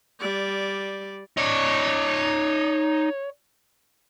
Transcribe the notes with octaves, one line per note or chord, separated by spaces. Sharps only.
G3 D5
D#4 C#5 D5